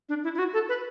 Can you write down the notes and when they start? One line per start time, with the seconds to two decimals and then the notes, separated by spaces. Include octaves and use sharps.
0.09 D4
0.24 E4
0.35 E4
0.39 F#4
0.53 A4
0.69 B4